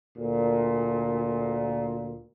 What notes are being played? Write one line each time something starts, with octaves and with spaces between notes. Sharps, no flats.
D2 A#2